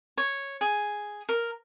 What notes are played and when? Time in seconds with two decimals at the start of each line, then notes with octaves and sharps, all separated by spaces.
0.17 C#5
0.61 G#4
1.29 A#4